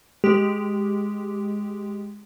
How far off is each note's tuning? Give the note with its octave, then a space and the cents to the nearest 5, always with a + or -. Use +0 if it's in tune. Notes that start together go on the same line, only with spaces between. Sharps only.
G#3 +0 G4 +0